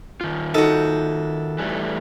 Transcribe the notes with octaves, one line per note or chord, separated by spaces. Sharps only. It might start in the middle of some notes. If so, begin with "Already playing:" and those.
D#3 F4
D#4 F#4 A4
E3 G3 A3